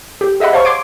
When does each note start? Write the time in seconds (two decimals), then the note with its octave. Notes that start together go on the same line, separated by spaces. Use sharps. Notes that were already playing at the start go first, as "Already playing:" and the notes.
0.21 G4
0.40 G#4 D#5 E5 F#5 B5
0.53 C5 C#5 F5 A5 C#6
0.65 C6 D6 G#6 C7 D7